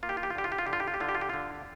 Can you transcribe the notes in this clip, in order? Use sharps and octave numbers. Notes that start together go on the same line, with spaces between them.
A#3 F4
G4
F4
G4
F4
D3 G4
F4
G4
F4
D3 G4
F4
G4
F4
G4
D3 F4
G4
F4
G4
D3 F4